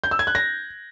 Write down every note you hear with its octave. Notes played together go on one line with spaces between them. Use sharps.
G6
E6
G#6
F#6
A#6